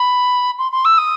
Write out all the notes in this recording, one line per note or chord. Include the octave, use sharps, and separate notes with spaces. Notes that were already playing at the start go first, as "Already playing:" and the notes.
Already playing: B5
C6
C6
E6
D#6